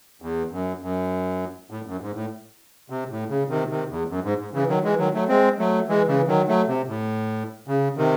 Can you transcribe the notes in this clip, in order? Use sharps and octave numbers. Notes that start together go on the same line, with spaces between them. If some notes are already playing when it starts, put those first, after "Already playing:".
E2
F#2
F#2
A2
F#2
G#2
A2
C3
A2
C#3
C3 D#3
C3 D#3
E2
F#2
G#2
G#2
C#3 E3
D#3 F#3
E3 G#3
D#3 F#3
F#3 A3
G#3 C4
F#3 A3
E3 G#3
C#3 E3
D#3 F#3
F#3 A3
C3
A2
C#3
C3 D#3